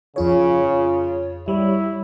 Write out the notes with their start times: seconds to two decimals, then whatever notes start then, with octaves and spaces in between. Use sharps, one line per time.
0.16 F2 C#3 F4 C#5
1.48 G3 E4 C#5